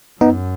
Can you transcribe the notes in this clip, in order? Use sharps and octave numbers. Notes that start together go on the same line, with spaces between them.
F#2 B3 D#4